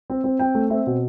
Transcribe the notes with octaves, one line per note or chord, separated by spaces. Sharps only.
C4
C4
C4 G5
A3
C4 E5
B2